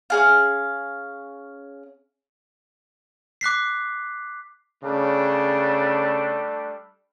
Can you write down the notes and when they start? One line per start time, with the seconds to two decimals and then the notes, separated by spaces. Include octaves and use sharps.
0.10 C#4 G#4 F5
3.41 D6 F#6 B6 C7
4.83 C#3 G3 A3 D4